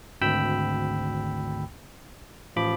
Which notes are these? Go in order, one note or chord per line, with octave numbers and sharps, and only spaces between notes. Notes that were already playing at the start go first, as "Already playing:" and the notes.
G#1 D2 G5 B5 E6
A1 F3 B5 D6